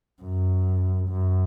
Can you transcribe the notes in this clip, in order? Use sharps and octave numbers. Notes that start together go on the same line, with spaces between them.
F#2
F#2